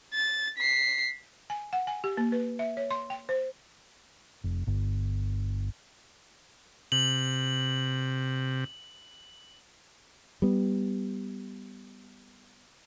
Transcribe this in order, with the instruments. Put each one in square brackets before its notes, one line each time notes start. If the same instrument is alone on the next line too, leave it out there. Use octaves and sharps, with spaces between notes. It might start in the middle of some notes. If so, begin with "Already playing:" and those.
[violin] A6
B6 C7
[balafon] G#5
F#5
G#5
G4
A#3
B4
E5
C#5
C6
G5
C5
[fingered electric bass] F1
G1
[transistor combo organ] C3 [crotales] F#7
[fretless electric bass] G3 B3